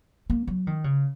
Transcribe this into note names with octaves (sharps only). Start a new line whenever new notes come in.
A#3
F#3
D#3
C#3